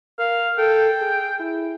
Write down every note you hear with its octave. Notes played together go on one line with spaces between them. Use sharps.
A#4 F5
A4 G5
G#4
E4